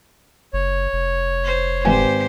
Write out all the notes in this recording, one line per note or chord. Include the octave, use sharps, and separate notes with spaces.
F#1 C#5
F1
C5
G#1 G4 B4 C5 G#5